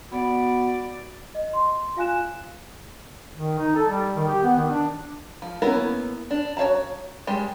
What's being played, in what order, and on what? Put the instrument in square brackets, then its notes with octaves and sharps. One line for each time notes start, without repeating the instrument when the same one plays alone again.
[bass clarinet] B3 [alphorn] F#4 [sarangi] D5
[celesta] D#5
C6
F4 F5 G#5 F#6 E7
[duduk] D#3
D#4
A4
G3
D#3
G4
B3
D#3
D4
[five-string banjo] F3
A#3 B3 C#4 E4 A#4
D4
F#4 C#5 F5 A5 A#5
G3 G#3 G4